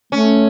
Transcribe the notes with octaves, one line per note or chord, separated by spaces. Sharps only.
A3 C#4